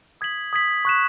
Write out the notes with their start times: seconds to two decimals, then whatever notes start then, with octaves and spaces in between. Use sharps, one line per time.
0.21 D#6 G#6 B6 F#7
0.53 D#6 G#6 B6 F#7
0.85 C#6 F#6 B6 E7